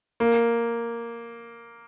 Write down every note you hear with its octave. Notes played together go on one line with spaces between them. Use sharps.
A#3